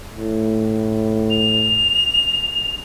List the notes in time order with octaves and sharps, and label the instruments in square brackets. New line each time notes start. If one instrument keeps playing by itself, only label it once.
[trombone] A2
[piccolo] F7